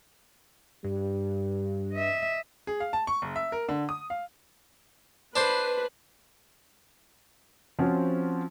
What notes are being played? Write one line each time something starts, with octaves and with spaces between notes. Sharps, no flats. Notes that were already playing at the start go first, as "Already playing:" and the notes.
G2 G3
D#5 E5
G#4
F5
A5
C#6
F#1
E5
A#4
D3
D#6
F5
D4 B4 C5 C6
F3 C4 C#4 F4 F#4 C5